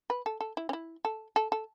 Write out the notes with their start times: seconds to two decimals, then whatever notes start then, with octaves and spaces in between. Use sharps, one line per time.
0.10 B4
0.26 A4
0.41 A4
0.57 E4
0.69 C#4
0.73 E4
1.05 A4
1.36 A4
1.52 A4